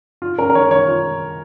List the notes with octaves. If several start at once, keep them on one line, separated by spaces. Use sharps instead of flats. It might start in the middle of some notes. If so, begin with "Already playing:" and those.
F4
C#4 A#4
A#4
D#3 C#5
D#3 C#5
F4